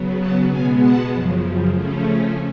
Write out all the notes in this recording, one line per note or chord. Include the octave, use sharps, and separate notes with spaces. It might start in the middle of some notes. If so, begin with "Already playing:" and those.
Already playing: C#3 F#3 B3
F#5 A5
B2 G#3 B3 F5 G#5
F#5 A5
F#2 C#3 F3
C#3 F3 A3 C#4